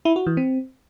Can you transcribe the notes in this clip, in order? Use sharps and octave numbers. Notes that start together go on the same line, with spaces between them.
E4
F#4
E3
C4